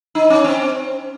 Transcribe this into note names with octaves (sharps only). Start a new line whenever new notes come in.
D#4
C#4
C4